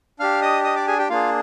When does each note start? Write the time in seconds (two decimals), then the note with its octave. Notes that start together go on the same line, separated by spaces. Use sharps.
0.19 D4 G4 F5 F6
0.42 D#5 D#6
0.64 D#5 D#6
0.76 D5 D6
0.87 G#4 G#5
0.98 G4 G5
1.10 A#3 D4 F4 G#4 F5